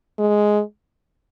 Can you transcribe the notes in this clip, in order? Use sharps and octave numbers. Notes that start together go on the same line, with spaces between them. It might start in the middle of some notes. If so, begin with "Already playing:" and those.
G#3